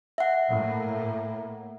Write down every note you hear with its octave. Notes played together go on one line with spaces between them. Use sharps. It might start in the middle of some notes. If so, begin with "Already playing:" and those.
E5 F#5
A2 A#3